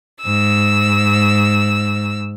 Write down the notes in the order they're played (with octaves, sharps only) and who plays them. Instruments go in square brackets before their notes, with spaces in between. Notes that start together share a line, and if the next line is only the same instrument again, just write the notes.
[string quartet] G#2 E6